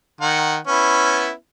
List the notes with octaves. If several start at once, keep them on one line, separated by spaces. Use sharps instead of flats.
D#3 F#5
B3 C#4 E4